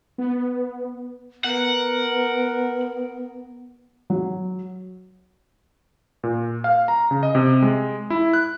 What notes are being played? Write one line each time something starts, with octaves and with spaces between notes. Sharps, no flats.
B3
B3 A#4 F#5
F#3
A#2
F5
A#5
C#3
D#5
C3
G#3
E4
F#6